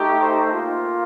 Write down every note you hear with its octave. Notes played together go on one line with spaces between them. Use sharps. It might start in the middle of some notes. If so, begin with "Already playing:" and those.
Already playing: A3 D#4 G4
C5
A#3 F4